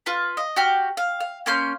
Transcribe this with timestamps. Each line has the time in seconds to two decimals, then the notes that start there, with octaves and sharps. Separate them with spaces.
0.06 F4 B4
0.37 D#5
0.56 F#4 G4 F6
0.97 F5
1.20 F5
1.46 A#3 C#4 C6 G6